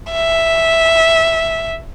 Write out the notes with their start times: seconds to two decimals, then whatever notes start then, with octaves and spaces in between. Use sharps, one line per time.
0.12 E5